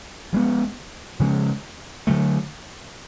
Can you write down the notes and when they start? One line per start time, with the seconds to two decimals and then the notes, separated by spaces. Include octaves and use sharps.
0.33 F3 G#3 B3
1.19 C#3 F3 G#3 C#4
2.07 D3 F#3 A3